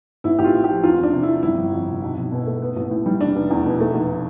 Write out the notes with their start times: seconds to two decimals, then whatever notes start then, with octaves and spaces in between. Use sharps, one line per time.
0.24 A1 E4
0.39 A1 G4
0.44 F4
0.54 A2
0.64 G4
0.69 F3
0.83 E2 F4
0.98 E2
1.03 D4
1.13 C3
1.23 E4
1.28 F3
1.43 G1 E4
1.58 G1
1.72 F2
1.87 C3
2.02 B1
2.17 B1
2.32 B2
2.47 A3
2.62 B3
2.76 A1
2.91 A2
3.06 G3
3.21 F1 D4
3.36 F1
3.51 E2
3.65 B2
3.80 A3
3.95 F1